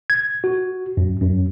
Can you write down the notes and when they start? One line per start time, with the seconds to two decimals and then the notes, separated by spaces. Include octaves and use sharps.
0.10 G#6
0.44 F#4
0.97 F#2
1.21 F#2